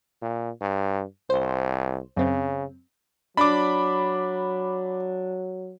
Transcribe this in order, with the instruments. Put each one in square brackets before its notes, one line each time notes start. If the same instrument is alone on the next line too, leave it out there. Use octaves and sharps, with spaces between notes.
[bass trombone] A#2
G2
[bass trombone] C2 [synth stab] C5
[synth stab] F#2 C4 [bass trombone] C#3
[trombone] F#3 [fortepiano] D4 [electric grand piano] B5 D6